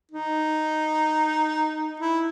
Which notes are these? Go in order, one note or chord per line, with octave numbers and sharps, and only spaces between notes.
D#4
E4